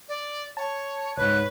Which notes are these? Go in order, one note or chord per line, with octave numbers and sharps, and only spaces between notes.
D5
C#5 A5
C#2 G#2 B4 C#5 F#6